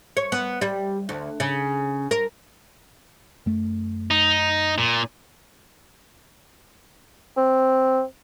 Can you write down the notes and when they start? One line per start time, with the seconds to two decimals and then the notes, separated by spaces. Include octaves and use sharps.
0.17 C#5
0.32 B3
0.61 G3
1.09 D2
1.40 C#3
2.11 A#4
3.46 F#2 A3
4.11 D#4
4.78 A#2
7.37 C4